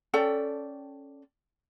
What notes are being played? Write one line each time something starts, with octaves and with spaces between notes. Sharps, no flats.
C#4 A4 D5 G5